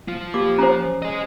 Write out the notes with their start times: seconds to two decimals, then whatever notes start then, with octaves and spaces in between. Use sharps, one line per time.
0.08 F3 F4
0.34 A#3 G4 D6
0.58 C#4 C5 A#5
1.02 G#4 D#5